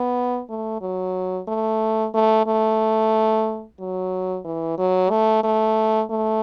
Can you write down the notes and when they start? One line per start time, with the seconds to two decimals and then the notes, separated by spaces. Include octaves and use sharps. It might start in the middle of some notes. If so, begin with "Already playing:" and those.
Already playing: B3
0.49 A3
0.81 F#3
1.48 A3
2.14 A3
2.46 A3
3.79 F#3
4.44 E3
4.78 F#3
5.10 A3
5.43 A3
6.10 A3